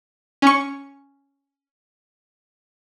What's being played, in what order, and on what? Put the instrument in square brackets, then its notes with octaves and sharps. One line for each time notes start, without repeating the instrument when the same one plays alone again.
[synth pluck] C#4 C#6